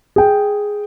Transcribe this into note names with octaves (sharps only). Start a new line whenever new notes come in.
G#4 G5